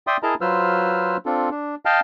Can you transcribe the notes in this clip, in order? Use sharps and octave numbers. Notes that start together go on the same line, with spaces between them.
D5 E5 G5 C6 D#6
E4 G#4 A#4 D#5 A5 A#5
F#3 F4 B4 C5 E6 F6
C4 D4 F4 A4
D4
D#5 F5 G5 A5 F6